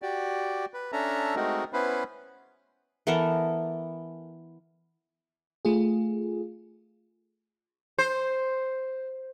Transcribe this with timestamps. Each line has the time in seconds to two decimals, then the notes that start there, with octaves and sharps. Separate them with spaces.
0.02 F#4 G4 D5
0.74 B4
0.92 C#4 D4 A4 E5 A#5
1.36 G#3 A3 C4 D#4 F#4 A#4
1.73 B3 C#4 E4 B4 C5
3.07 E3 B3 A4 A#4
5.65 A3 F4 G#4
7.98 C5